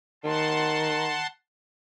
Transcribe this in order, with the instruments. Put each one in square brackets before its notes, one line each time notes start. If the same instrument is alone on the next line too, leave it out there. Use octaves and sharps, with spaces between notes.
[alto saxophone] D#3 [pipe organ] F#5 A5 C6